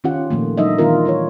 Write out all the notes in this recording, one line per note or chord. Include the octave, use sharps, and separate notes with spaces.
D#3 C#4 F4 G4 F#5
A#2 D#3 F3 A3 A#3
F#3 G3 D4 D#4 D#5 E5
D#3 E3 G3 B3 F4 A#4
G3 F4 C#5